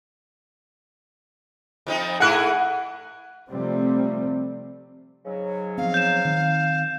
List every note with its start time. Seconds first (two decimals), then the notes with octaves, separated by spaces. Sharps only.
1.87 F2 F3 D#4
2.20 A3 E4 G#4 F#5 F#6
3.51 C3 F3 G3 A3 C4
5.25 G#2 C#3 F#3
5.78 F3 B3 C4 F5
5.94 G6 E7
6.25 D#3 C4